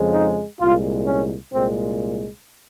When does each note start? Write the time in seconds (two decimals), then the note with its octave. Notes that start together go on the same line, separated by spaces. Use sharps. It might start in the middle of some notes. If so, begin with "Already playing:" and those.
Already playing: F2 C#3 F3 G#3
0.13 D#4
0.60 C2 A#2 G#3 F4
1.07 C#4
1.54 C2 A#2 G#3 C4